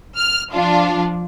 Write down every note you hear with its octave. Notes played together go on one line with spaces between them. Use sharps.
F6
F3 D4 F4